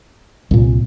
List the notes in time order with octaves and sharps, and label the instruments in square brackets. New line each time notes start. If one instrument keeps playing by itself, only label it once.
[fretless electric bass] C2 A#2